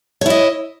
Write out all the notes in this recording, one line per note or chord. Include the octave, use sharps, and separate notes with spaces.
E4 C#5 D#5